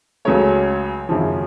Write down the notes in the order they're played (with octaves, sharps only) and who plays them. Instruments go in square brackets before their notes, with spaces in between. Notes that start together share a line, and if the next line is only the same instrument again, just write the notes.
[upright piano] C#2 C#3 F#3 A3 C#5
G#1 F#2 C#3 F3